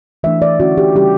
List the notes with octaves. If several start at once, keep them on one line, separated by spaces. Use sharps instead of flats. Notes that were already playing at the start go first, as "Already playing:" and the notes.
E3 A3 D4 E5
D5
D3 A3 C#4 E4 F#4
G4
C#3 G3 C#4 G4